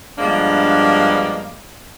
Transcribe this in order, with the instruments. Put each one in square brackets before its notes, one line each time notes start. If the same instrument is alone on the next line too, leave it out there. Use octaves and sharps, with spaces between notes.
[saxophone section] G2 F3 G#3 A#3 B3 D4